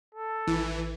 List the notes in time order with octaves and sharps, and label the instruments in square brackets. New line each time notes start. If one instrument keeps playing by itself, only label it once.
[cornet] A4
[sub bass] A1 [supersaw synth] E3